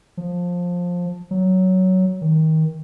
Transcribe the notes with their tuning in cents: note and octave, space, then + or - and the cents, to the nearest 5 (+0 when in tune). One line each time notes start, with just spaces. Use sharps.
F3 +15
F#3 +10
D#3 +25